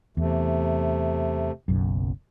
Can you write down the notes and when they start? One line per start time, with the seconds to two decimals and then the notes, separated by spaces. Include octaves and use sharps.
0.17 E2 C3 A3
1.68 F#1 B1 F#2